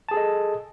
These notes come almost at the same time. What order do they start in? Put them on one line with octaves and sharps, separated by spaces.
A5 G#4 A4 D#5